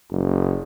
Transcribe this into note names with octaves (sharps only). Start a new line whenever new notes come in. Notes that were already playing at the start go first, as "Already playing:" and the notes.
F#1